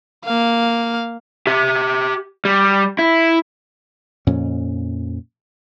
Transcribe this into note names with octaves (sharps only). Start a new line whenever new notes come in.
A#3 F5
G4 E5
G3
E4
F2 A#2 C#4